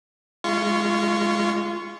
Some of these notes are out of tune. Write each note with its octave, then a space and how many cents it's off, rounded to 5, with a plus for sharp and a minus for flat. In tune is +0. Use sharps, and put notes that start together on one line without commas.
G#3 +0 F4 -25 C#6 +0